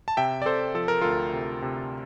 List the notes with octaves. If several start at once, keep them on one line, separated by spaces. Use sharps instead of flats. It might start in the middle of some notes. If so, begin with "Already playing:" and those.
A5
C3 E5 G5
D5
C3 A4 C5
F3 A4
A#4
D2 F4 A4
C3
C3